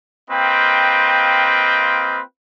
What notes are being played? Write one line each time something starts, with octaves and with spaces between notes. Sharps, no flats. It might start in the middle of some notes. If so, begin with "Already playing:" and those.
A#3 C4 F4 B4 D#5 G5